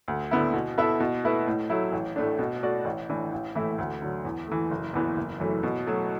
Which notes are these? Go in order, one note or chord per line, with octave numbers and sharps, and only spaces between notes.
D2
D3 B3 E4
B2
B3 E4 A4 E5
B2
A3 E4 B4
A2
F#3 A3 E4
A1
A2 A3 D4
B2
A3 F#4 D5
A1
A2 E3 D4
A1
A2 E3 A3 E4
D2
D3 F#3
E2
E3 A3
F#1
E2 E3 B3
F#1
F#2 E3 A3
B2
F#3 A3